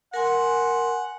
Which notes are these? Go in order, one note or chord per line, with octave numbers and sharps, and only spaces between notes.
A#4 F#5 G#5 C6